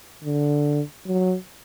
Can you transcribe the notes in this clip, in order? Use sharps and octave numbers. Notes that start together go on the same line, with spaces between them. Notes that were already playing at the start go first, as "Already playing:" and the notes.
D3
F#3